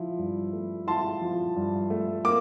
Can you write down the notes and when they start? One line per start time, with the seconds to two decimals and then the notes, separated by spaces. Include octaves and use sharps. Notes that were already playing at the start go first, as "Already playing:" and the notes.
Already playing: F3 E4
0.18 G2
0.53 A3
0.87 E4 A5 C6
1.21 F3
1.56 G2
1.90 A3
2.25 A#3 D6